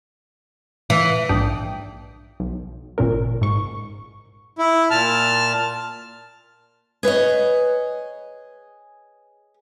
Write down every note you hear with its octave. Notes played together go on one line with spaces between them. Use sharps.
E3
A#1 G#2 D4 G5 D#6
B1
G#1 A#2 C#4 A#4
G#2 C#6
E4
A#2 A5 F6
G#4 B4 C#5 D#5